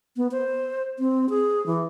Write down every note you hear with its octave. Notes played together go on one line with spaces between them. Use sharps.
B3
C5
C4
G#4
E3